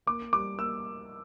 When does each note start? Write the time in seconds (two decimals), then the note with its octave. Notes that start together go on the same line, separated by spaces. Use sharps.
0.07 A#3 D6
0.33 G3 D6
0.58 A#3 E6